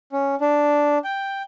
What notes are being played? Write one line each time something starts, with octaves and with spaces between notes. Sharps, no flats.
C#4
D4
G5